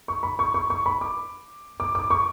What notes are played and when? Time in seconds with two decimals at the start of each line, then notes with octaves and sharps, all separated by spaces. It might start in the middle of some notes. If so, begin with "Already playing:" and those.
0.08 C#6
0.23 B5
0.39 C#6
0.54 C#6
0.70 C#6
0.86 B5
1.01 D6
1.80 D6
1.95 D6
2.10 C#6